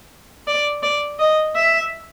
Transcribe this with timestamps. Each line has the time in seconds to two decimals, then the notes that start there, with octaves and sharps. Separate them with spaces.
0.48 D5
0.83 D5
1.19 D#5
1.56 E5